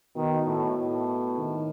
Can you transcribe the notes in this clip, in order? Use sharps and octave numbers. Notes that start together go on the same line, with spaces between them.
B2 D#3
A2
A2
D#3